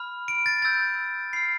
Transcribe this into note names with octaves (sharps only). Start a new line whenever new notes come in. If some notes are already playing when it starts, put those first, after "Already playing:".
Already playing: B5 F6
D7
A6
B5 E6 G6 A6
B5 F6 C7